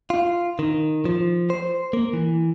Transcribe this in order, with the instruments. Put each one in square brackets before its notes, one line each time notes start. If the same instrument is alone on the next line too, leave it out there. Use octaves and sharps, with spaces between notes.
[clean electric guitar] F4
D#3
F3
C5
A#3
E3